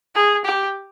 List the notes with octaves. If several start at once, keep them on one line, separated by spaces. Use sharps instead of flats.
G#4
G4